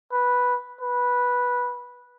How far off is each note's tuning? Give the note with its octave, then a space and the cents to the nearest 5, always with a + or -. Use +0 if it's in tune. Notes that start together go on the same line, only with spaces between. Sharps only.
B4 -5
B4 -10